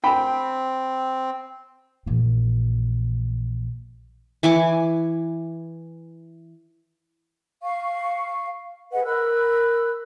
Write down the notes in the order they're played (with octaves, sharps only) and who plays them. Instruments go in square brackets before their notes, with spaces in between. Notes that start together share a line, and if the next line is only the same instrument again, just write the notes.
[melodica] C4 [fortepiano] G5 B5
[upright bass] A#1 E3
[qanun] E3 G#5 C#6 D6
[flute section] F5 C#6
G#4 B4 D#5 F#5
A#4 B5 E6 F#6